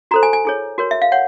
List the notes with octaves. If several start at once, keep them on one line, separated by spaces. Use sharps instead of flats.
F#4 A4 C5 A#5
G#5
G#5
E4 G#4 C#5
F#4 A#4 C#5
E5
F5
C#5 F#5